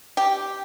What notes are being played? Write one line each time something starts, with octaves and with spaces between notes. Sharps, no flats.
G4